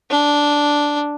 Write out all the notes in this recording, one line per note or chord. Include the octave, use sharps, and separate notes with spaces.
D4